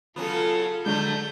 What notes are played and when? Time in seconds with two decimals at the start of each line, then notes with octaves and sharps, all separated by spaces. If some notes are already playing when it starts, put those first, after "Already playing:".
0.16 C#3 F#3 B3 F4 A4
0.86 D3 F#3 G#3 A3 G6